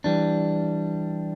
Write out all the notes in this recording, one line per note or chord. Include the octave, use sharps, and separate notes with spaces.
E3 G3 D4